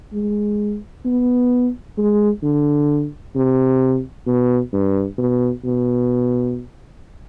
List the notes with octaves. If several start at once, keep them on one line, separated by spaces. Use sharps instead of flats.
G#3
B3
G#3
D3
C3
B2
G2
B2
B2